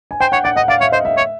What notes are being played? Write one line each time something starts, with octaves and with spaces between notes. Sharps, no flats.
G#5
C5 G5
C#5 F#5
D5 F#5
D#5 F#5
D5 F5
C#5 E5
C5 D#5
E5
C#5